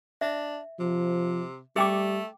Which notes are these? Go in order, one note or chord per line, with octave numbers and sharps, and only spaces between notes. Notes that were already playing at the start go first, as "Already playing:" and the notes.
D4 E5
C3 F3
G3 A3 G#4 G5 D6